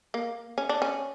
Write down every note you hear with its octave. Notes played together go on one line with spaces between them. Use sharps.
A#3
C#4
D4
C#4